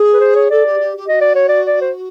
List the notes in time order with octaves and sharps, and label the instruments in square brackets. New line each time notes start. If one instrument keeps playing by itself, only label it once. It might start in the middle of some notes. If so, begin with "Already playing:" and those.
Already playing: [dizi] G#4
[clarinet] B4
C5
C#5
[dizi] A4 [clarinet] D5
[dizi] G4
G4
G4
[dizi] F#4 [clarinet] D#5
[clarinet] D5
C#5
D5
D5
C5